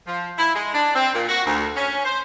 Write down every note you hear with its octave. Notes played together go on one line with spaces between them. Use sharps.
F3
E4
G#3
D4
C4
A#2
F#4
D2
C#4
C5